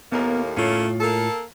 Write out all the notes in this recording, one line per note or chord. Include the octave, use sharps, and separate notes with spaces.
D#2 A2 A#3 B3 A#4
A2 A3 A#3 C#4 F4 C#5
A#3 A4